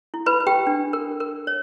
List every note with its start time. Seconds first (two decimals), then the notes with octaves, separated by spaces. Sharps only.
0.14 E4
0.26 B4 B5
0.40 B4
0.47 G4 G5
0.67 D4
0.93 A#4
1.20 A#4
1.47 C#5